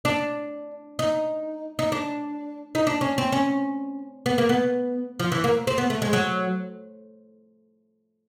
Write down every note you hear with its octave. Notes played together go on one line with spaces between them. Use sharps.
D4
D#4
D#4
D4
D#4
D4
C#4
C4
C#4
B3
A#3
B3
F3
E3
A#3
C4
B3
A3
G#3
F#3